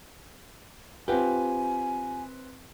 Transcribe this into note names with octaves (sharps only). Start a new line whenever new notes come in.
C4 F4 G4 B4 G#5